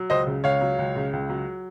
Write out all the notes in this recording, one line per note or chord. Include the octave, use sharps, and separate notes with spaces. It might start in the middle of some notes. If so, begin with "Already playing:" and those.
Already playing: F#3
C#2 C5 D#5
C#3
C#2 C#5 F5
F#3
C#2
C#3
C#2
F#3